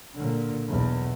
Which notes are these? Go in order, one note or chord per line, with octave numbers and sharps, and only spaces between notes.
A#2 D3
B1 E2